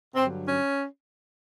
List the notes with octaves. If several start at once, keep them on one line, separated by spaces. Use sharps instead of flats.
G2 D3 F#3 C4
C#4